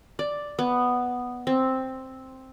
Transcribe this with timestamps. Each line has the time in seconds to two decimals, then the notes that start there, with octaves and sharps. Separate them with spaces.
0.19 D5
0.59 B3
1.47 C4